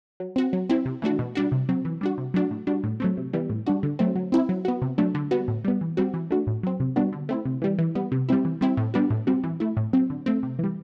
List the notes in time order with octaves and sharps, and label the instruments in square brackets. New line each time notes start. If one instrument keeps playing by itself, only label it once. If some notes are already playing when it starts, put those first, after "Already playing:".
[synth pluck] F#3
C4 F#4
F#3
C4 E4
C3
E3 A3 D4 F#4
B2
G3 D4 F#4
C3
F#3 C4
E3
G3 D4 F#4
C3
F#3 A3 D4 F#4
A2
G3 D4 F#4
A2
F#3 A3 C4
C3
E3 G3 B3
A2
G3 D4 F#4
D3
F#3 A3 C4
F#3
C4 E4
F#3
B3 F#4
C3
F#3 A3 D4
D3
G3 B3 F#4
A2
G3 B3
E3
G3 C4 F#4
E3
A3 D4 F#4
A2
F#3 C4
C3
G3 B3 D4 F#4
D3
A3 C4 E4
C3
E3 G3
E3
G3 B3
C3
G3 C4 E4
E3
G3 C4 E4
A2
G3 B3 D4 F#4
A2
G3 C4 F#4
E3
A3 E4
A2
F#3 C4
D3
A3 C4
C3
E3 G3